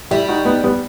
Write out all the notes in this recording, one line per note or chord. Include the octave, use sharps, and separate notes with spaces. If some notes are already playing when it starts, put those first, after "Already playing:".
G3 E4 G4
D#4 F#4
B3 D#4
G3 B3